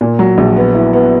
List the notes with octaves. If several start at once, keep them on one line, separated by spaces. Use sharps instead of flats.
A#2
F#3
A#1
B3
E4
B3